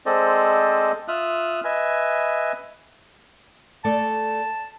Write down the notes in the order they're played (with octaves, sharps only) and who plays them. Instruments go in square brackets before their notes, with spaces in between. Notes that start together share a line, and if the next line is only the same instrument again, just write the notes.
[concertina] G#3 C4 A4 C5 D5 D#5
F4 E5 D#6 F6 F#6
B4 D#5 E5 G#5
[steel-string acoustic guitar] A3 A4 D5 [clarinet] A5